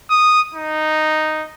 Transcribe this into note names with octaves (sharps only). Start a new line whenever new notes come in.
D#6
D#4